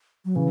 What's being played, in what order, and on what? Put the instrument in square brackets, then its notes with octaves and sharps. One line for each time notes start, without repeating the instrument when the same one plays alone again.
[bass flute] F#3
[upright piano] C#3 [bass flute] E3